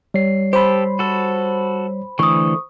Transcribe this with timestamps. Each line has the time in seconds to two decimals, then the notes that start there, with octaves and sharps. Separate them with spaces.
0.14 G3 C#5 C7
0.53 G4 A4 C5 B5
0.99 F#4 A4
2.19 D3 E3 A3 C#6 D#6